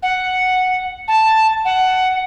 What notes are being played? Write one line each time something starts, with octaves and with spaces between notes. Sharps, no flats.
F#5
A5
F#5